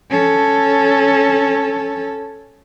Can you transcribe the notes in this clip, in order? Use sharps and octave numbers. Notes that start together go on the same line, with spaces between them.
C#4 A4